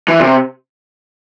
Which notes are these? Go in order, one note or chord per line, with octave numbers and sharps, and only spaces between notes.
E3
A#2
C3